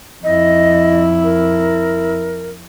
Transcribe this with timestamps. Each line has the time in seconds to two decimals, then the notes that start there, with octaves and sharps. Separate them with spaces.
0.24 F2 E4 D#5
1.24 A#4